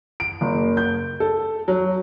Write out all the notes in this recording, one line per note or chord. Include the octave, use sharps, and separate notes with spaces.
D7
F#1
G6
A4
F#3